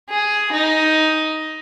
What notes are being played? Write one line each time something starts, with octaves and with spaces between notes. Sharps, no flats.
G#4
D#4